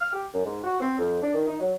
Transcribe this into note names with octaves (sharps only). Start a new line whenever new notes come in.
F6
G4
F#2
G#2
F#4
C4
F2
D4
D#3
D#4
F#3